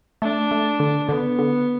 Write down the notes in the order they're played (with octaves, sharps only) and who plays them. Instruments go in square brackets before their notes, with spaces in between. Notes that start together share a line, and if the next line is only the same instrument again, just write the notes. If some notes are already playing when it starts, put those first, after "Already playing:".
[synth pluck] A3 [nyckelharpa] D4
[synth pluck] A3
D3
[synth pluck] D3 [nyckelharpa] B3
[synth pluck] D3